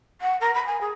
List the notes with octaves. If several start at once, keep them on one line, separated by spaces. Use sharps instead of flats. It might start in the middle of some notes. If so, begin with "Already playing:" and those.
F#5
A#4
B5
G#5
G#4